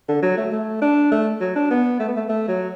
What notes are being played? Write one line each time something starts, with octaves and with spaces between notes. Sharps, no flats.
D3
F#3
A3
A3
D4
A3
F#3
D4
B3
A3
B3
A3
A3
F#3